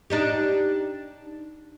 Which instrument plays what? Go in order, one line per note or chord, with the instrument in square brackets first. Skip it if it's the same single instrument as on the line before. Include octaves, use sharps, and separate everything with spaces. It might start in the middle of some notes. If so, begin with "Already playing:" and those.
[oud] D4 D#4 G4